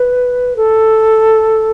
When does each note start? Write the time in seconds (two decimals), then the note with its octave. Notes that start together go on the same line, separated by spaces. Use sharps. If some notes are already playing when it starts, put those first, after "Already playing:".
Already playing: B4
0.56 A4